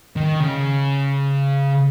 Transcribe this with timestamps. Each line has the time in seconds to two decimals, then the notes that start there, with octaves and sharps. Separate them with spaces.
0.16 D#3
0.40 C#3